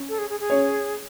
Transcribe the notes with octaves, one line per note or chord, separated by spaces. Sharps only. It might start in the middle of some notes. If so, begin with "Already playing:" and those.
Already playing: C#4
A4
G#4
G#4
G#4
C#4 C#5